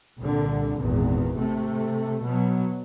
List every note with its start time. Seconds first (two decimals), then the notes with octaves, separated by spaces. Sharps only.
0.19 C2 A#2 D3
0.80 G#1 E2 A#2
1.37 C3 A3
2.22 B2 F#3